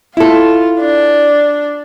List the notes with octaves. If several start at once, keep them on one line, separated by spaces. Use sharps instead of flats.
E4 F4 A4
D4